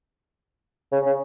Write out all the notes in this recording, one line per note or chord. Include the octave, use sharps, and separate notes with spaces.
C#3
C#3